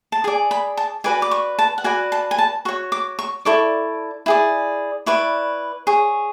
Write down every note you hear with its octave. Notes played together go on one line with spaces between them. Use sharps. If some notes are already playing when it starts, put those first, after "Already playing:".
A5
G#4 D5 G#5
B5
A5
F#4 B4 D5 G#5
D6
C#6
A5
F#5
F#4 B4 D5 G#5
A5
G#5
A5
F#4 C#5 C#6
D6
C#6
E4 A4 D5 C#6
E4 G#4 D5
E4 B4 D5 C#6
G#4 C#5